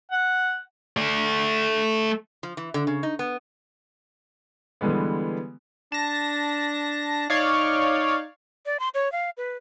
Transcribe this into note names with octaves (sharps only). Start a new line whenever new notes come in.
F#5
A3 D5
F3
E3
D3
C#3
D#4
B3
D3 E3 G3 G#3 B3
D4 A5 A#6
D#4 C#5 D5 F5
D5
C6
C#5
F5
B4